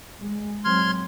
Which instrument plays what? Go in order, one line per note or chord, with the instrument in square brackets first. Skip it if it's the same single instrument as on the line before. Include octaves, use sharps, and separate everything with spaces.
[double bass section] G#3
[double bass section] F#3 G#3 C4 [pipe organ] C6 F6 G#6